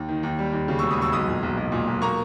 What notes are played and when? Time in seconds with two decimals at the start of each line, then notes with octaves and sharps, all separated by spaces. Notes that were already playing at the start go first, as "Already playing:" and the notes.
Already playing: D#2
0.08 D#3
0.23 D#2
0.39 G3
0.53 D#2
0.68 C#3
0.79 E1 C#6 E6
0.91 B5 D#6
0.98 E1 C#6 E6
1.12 B1 B5 D#6
1.28 A#2
1.43 B1
1.57 B1
1.72 A#2
1.87 B1
2.02 A#3 A#5 C#6